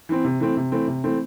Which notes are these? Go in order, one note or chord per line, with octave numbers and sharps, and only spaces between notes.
E3 C4
C3
E3 A3 C4
C3
E3 A3 C4
C3
E3 A3 C4